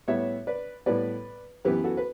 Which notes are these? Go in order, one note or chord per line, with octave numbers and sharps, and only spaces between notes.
A2 G3 B3 C#5 E5
B4 D5
A2 G3 B3 B4 D5
F#2 E3 B3 G4 B4
F#4 A4
B4